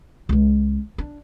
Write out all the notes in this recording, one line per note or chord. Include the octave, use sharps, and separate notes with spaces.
C#2 G#3
D4